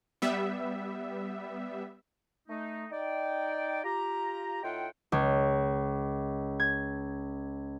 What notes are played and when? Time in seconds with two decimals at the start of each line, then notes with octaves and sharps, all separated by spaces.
0.22 G3 B3 E5
2.49 A3 D#4
2.92 D#4 D5 G5
3.84 F4 G4 A#5
4.63 A2 D#4 F4 E5 F#5 G5
5.12 C#2
6.60 G#6